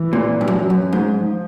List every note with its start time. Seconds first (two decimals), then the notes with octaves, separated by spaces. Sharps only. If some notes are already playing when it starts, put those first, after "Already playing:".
Already playing: E3
0.13 A#2
0.41 G2
0.48 F#2
0.70 F#2
0.93 G#2
1.15 F3